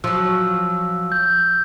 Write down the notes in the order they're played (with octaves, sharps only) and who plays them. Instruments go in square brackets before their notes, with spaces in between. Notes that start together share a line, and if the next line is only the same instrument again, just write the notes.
[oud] F3 F#3 [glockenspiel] E6
[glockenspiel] G6